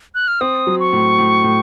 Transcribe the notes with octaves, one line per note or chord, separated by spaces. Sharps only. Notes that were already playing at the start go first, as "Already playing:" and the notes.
F#6
F6
C4 D#6
F#3
C#6
A2
A2
A2